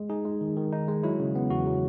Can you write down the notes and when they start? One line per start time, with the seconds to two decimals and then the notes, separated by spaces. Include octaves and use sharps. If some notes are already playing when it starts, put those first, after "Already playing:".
Already playing: G#3
0.10 D#4 G#4
0.25 G#3
0.41 D#3
0.56 D#3
0.72 D#4
0.88 G#3
1.03 F#3 E4
1.20 C#3
1.35 B3
1.50 E2 F#4
1.66 F#3